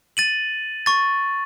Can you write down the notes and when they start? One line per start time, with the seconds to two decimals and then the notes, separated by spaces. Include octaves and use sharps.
0.17 A6 D#7 F#7
0.86 C#6 A6